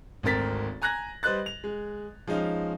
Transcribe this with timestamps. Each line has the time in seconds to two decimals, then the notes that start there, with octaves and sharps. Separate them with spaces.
0.23 G#1 D2 C4 A#4 A6 B6
0.82 G#5 A#5 F#6 G#6 A#6
1.23 G3 B4 C5 D#5 F#6 A6
1.46 F7
1.64 G#3
2.27 F3 G#3 C#4 D#4 F4